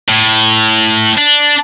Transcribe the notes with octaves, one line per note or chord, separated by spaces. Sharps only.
A2
D4